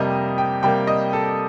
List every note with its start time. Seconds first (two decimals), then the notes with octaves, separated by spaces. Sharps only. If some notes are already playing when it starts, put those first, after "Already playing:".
Already playing: F2 C3 G3 A#3 D#5
0.38 G5
0.63 C3 G3 A#3 G5
0.87 D#5
1.13 A4